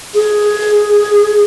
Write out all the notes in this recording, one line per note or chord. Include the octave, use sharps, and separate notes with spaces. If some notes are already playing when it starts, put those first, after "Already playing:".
G#4